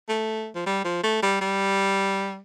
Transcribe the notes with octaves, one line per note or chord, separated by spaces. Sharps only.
A3
F3
G3
F3
A3
G3
G3